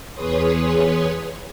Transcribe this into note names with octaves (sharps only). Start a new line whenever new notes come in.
E2 G#4 B4 C#5 C6 D#6